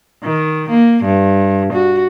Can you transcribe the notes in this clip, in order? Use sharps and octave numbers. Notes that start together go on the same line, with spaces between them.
D#3
A#3
G2
F#4